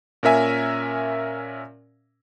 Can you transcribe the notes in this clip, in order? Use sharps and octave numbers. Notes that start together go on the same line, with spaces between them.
A#2 C#4 A#4 E5 G#5